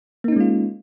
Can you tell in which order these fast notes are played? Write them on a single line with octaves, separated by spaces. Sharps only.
A#3 D#4 C#4 G#3 F4